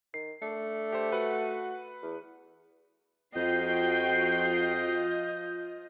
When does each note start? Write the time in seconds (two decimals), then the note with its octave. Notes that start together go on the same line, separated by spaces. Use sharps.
0.14 D#3 C7
0.42 A3 D4
0.93 G4 C5
1.12 F#4 B4 F#5
2.03 E2
3.36 F2 F3 F4 F#4 D#5 G5 G6 C7